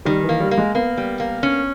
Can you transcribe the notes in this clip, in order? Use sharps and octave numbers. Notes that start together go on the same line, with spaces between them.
D#3 G3
E3
A#3
G3
A#3
G#3
A#3 B3
G3
A#3
C#4